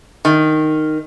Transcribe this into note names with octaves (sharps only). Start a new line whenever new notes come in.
D#3